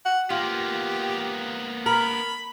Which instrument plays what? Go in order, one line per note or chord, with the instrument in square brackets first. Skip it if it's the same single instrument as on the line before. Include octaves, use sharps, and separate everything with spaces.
[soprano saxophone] F#5
[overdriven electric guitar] A#3 B3 [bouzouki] F4 [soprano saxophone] G4
[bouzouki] A#4 [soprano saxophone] B5